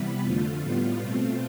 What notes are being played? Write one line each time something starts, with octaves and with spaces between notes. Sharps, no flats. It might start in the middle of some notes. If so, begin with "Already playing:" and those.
Already playing: C3 E3 G3 B3 B4
F2 D3 A3 F4
A2 G3 B3 F4
B2 A3 C4